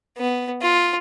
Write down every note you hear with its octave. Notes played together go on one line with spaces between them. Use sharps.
B3
F4